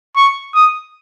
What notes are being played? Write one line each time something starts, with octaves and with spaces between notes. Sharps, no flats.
C#6
D#6